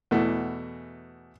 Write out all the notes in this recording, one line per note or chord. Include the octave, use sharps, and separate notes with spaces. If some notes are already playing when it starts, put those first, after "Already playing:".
E2 B2 E3 A3